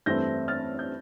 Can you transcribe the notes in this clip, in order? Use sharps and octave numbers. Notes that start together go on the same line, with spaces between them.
G2 E3 A3 C4 G6 A#6
F6 A6
G6